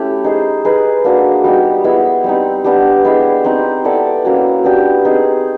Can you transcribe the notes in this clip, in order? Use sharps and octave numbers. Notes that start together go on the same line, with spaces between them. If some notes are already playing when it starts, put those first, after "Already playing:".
Already playing: A3 C#4 E4 G4
D#4 G#4 C5
D#4 G#4 B4
A#3 D4 F#4 A#4
G3 B3 D#4 G4
G#3 B3 E4
G3 C4 D#4
B3 D4 G4
G#3 B3 E4 G4
C4 D#4 G4
B3 E4 A4 D5
A#3 C#4 F#4
B3 D4 G4
C4 D#4 G#4